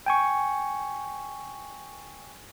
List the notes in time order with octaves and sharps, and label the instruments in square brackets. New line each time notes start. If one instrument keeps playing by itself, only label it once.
[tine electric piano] G5 G#5 C#6